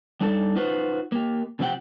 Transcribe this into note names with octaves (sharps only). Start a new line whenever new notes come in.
G3 D4 D#4 A4
D#4 F4 F#4 B4 C5
A#3 G4
C3 F3 C4 G4 F#5 G5